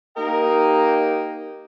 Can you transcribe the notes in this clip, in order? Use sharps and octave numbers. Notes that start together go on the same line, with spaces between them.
A#3 D#4 G4 A#4 D#5 G5